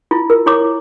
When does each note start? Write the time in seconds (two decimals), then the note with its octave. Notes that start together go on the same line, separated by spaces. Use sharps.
0.11 E4 F4
0.30 A#4
0.46 E4 C#5 D6